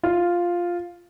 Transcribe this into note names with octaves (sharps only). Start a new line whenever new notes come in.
F4